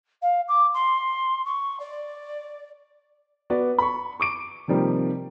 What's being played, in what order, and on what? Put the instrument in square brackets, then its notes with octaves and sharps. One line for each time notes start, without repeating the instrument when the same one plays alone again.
[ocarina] F5
D6
C6
C#6
D5
[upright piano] B3 F#4 D5
B5 C#6
C#6 D6 D7
C3 D#3 F3 G3 A#3